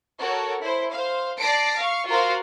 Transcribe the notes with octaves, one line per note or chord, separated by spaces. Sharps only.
F#4 A4 A#4 C#5
E4 C5
C5 F5
D5 A5 A#6 C7 D7
F5 C#6
F4 F#4 A#4 C5 F5